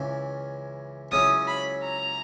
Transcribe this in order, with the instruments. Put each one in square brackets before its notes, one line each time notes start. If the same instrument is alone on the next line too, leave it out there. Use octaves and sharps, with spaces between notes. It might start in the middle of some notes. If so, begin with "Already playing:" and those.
Already playing: [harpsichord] C#2 C#3 E3
[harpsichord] C#2 C#3 F#3 C#4 E4 [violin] D#6
[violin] B5
A#5